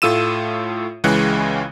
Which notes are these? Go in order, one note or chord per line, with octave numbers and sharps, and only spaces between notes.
A2 A3 F4 E6 D#7 E7
C#2 C#3 E3 G#3 F#6 C#7